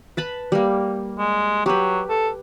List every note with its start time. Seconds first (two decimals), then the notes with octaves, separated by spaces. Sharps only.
0.17 B4 A5 B5
0.52 G3 A#3
1.18 G#3
1.66 F#3 G4 B4
2.09 A4